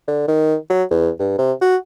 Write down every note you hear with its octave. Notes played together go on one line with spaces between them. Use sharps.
D3
D#3
F#3
E2
G2
C3
F#4